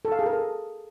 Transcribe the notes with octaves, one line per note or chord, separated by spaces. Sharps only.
A4
F5
G#4
A#4
A4